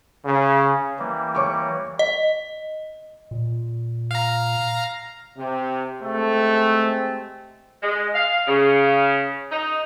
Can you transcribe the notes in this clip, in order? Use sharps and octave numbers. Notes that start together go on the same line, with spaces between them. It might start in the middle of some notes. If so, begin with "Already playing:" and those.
C#3
E3 G3 A#3
C#5 C#6 D6
D#5
A#2
F5 A#5
C3
C3 G#3 A3 C4
G#3
F5
C#3
D#4